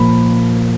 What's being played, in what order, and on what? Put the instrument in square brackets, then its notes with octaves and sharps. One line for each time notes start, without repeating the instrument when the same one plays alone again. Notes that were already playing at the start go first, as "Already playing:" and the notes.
Already playing: [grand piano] A#2 F3 A#3 B5